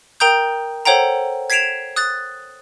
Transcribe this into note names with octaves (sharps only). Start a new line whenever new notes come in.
A#4 G5 A#5 D#6 G6
A4 C5 C#5 F#5 G5 A#5
G#6 B6 C7 D7 E7 F7
D#6 F#6 A6